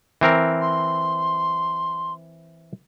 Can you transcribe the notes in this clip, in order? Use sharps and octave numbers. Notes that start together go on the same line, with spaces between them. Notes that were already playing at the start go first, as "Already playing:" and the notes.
E3 C4 A#4
C6